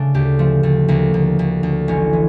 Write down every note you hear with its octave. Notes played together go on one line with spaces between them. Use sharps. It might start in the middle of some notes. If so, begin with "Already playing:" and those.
Already playing: C#3 A3 D4
D2 G4
F3 A3
D2 A3
D2 A#3
D2
D2
D2
A1 C#4
E3